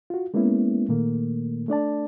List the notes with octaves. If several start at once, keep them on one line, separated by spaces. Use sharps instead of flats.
F4 F#4
G#3 A#3 B3 C#4 E4
A#2 D#3 A3 A#3
A3 D4 D5 A5